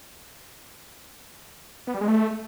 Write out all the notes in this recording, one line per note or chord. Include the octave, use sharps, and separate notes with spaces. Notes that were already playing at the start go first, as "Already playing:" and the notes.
B3
G3
G#3
A3